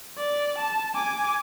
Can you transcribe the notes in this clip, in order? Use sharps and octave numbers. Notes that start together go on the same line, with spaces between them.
D5
A5
G#5 D6